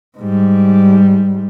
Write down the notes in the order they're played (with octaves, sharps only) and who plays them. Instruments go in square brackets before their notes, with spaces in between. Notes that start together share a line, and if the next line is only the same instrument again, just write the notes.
[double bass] G#2 G3